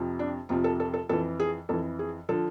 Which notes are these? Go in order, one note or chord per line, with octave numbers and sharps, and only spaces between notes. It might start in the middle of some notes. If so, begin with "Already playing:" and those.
Already playing: F2 C3 F3
D4
F2 C3 F3 F4
A4
A4
A4
F2 E3 A4
G#4
F2 E3 A4
G#4
D3 F3 A4